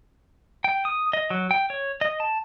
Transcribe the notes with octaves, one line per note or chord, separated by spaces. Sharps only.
G5
D#6
D#5
F#3
G5
C#5
D#5
A5